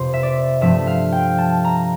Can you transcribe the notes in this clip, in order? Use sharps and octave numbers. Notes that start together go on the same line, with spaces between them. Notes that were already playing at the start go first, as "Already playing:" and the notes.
Already playing: F1 F2 C3 C5
E5
D5
G2 F3 A3 C4 E5
F5
G5
A5
A#5